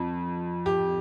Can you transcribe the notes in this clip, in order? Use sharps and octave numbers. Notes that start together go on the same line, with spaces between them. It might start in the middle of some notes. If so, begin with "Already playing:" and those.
Already playing: F2
G4